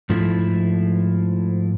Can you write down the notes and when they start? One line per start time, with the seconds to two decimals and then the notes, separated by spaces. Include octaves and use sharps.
0.10 G#2 F3 A3 E4